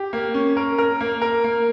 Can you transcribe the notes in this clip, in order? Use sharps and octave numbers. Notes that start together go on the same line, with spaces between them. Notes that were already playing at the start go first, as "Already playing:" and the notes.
Already playing: G4
A#3
C#4
A#4
A#4
A#3
A#4
A#3